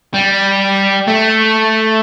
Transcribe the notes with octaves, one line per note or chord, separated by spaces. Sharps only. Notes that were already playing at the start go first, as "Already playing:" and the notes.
G3
A3